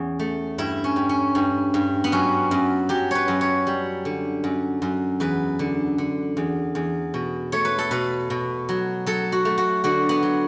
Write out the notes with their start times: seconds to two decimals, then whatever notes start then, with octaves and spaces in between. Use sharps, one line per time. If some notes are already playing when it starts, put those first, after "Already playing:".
Already playing: E2 C#4
0.19 A3
0.58 G2 E4
0.84 C#4
0.96 G2
1.09 C#4
1.35 G2
1.74 G2
2.04 B3
2.12 F#2 C#4
2.51 F#2
2.89 F#3 G4
3.11 B4 C#5
3.28 F#2
3.41 C#5
3.67 G3
4.05 D3
4.44 F#2
4.82 F#2
5.20 E2 B4
5.59 D3
5.98 D3
6.37 E2
6.75 E2
7.14 B2
7.52 A3 C#5
7.65 B4
7.78 A4
7.91 B2 B4
8.30 B2
8.69 F#3
9.06 F#3 A4
9.32 F#4
9.45 A3
9.58 F#4
9.84 D3 F#4
10.09 B3
10.23 F#3